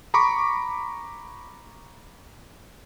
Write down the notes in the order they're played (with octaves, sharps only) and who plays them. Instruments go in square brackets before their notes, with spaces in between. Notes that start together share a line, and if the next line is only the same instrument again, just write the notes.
[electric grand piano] A#5 B5 C#6 D6